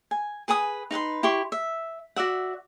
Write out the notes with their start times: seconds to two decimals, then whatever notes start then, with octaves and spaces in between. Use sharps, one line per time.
0.11 G#5
0.48 G#4 B4 G#5 D#6
0.91 D#4 B4 F#5 C6
1.23 E4 G4 C6 C#6
1.52 E5
2.16 F#4 D5 E5 F#5